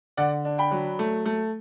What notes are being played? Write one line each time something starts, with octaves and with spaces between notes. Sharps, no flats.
D3 D5 F#5
D4
G5 B5
F#3
A3
A3